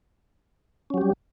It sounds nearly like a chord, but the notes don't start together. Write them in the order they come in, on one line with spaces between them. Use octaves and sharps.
C#4 F#3 G4 G3